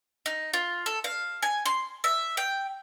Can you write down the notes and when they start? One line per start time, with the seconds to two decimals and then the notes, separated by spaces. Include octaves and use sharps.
0.26 D#4
0.53 F4
0.86 A4
1.04 F5
1.42 G#5
1.66 C6
2.04 E5
2.37 G5